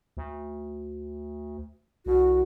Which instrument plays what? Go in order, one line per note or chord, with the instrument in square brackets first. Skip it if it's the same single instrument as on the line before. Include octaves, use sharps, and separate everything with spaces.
[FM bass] D2
[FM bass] C2 [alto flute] F#4